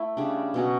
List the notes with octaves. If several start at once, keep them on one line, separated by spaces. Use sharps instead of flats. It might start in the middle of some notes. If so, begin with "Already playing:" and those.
Already playing: A3 E4
C#3 G3 D4
B2 F#3 C#4 F#4